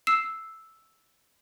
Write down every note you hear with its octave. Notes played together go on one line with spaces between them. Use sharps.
E6 C7 E7